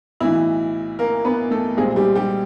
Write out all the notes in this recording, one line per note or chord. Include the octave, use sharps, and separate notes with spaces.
B1 A2 E3 E4
A#3 A#4
B3 B4
A3 A4
B1 A#2 G3 G#3 C4 G#4
G3 G4
G3 G4